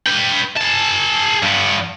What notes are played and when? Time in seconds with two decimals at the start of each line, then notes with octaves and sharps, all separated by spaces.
0.06 B4 G5
0.57 G#4 A5
1.42 G2 B3